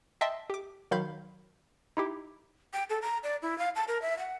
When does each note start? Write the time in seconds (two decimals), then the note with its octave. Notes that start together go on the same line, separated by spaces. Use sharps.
0.21 D#5 E5 G5 A5 C6
0.50 G4 D6
0.91 D#3 F#3 F5 B5 C6 G6
1.97 D#4 E4 G4
2.74 G5
2.90 A4
3.02 A#5
3.23 D5
3.42 E4
3.59 F5
3.76 A5
3.88 A#4
4.02 E5
4.19 F#5